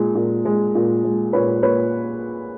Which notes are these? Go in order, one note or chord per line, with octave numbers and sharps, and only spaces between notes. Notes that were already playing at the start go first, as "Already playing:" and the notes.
Already playing: A#2 G#3
A#2
G#3
A#2
G#3
A#2 B4 C#5
A#2 B4 C#5